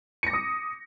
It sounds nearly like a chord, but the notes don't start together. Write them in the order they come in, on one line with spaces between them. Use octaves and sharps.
C#7 A#6 D6 D#6